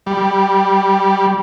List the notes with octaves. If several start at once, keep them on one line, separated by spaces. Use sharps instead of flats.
G3